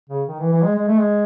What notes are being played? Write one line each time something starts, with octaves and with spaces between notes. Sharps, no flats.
C#3
D#3
E3
E3
G#3
G#3
A3
G#3